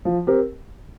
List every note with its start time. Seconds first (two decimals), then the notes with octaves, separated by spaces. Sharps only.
0.05 F3
0.27 C4 G4 A#4